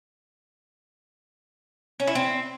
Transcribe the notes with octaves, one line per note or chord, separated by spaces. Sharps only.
C#4
E4
C4